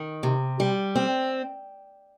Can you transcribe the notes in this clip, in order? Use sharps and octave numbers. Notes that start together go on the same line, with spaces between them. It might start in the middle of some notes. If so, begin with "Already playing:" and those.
Already playing: D#3
C3
G3
C4